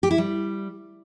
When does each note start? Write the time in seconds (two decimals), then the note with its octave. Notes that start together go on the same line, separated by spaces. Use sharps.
0.03 G4
0.11 E4
0.18 G3